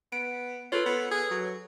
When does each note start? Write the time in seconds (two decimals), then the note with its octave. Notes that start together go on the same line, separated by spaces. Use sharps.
0.12 B3 D7
0.72 F4 A4 B4 C#5
0.86 B3
1.11 G#4
1.31 F#3